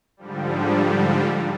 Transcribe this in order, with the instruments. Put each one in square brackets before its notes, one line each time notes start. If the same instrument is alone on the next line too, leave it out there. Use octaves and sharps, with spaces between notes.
[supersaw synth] G#2 D3 F3 G3